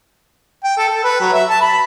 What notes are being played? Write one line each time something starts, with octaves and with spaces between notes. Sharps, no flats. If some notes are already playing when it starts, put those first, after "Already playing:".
G5
A4
A4
B4
F#3
E5
A5
B5